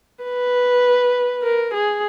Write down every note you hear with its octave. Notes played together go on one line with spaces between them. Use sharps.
B4
A#4
G#4